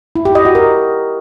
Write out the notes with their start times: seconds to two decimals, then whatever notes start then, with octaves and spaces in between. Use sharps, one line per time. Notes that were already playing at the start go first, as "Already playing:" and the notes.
0.16 E4
0.25 G4
0.35 D#5
0.45 F#4
0.55 A#4